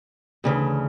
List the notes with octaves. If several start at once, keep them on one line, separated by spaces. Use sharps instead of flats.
D2 C#3 E3